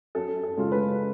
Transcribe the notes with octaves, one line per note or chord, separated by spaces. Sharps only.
F#2 A4
A4
C#3 G#3 C#4 F4
B4